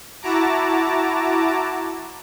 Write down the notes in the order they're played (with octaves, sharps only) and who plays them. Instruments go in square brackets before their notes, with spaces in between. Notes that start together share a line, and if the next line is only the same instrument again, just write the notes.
[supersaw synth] E4 F#4 A5 A#5 D6